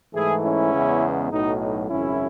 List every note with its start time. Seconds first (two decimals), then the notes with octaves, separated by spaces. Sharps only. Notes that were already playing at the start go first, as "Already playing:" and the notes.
0.14 G#2 E3 A3 E4 G#4
0.43 C#4 E4
0.73 E2 C#3 G#3 B3
1.31 B1 A2 F#3 D#4
1.60 D#4
1.89 G#1 F#2 C#3 C#4 E4